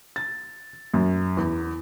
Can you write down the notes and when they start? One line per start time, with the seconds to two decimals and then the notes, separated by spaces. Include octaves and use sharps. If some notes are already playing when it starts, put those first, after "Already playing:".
0.16 A6
0.94 F#2
1.37 E2